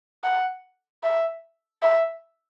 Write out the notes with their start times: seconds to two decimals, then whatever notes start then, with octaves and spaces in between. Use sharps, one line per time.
0.24 F#5
1.04 E5
1.82 E5